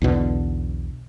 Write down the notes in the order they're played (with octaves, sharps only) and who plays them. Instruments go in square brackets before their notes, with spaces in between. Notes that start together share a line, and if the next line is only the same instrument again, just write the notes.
[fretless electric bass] B1 E2 B2 D3